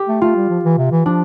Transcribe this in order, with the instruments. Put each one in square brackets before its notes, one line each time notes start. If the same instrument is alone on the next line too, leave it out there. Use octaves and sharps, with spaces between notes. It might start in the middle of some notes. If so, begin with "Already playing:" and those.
Already playing: [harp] G4
[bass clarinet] A3
[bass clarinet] A3 [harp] F4
[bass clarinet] G3
F3
E3
C3
E3
[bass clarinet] F3 [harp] D4